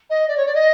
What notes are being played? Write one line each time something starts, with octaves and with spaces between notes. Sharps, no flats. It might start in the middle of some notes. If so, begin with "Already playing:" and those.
D#5
D5
C#5
D5
D#5